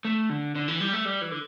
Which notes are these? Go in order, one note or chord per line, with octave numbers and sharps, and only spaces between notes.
A3
D3
D3
E3
G3
A3
G3
E3
D3